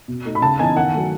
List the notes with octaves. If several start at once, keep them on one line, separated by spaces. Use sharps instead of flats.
B2
A3 D#4
B5
C#3 A5
E3 B3 D#4 G#5
D#3 F#5
F#3 A3